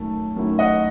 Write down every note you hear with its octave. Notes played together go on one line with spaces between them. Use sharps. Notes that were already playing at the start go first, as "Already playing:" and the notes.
Already playing: F#2 D#3 A3 A5
F#2 D#3 A3 E4
D#5 F#5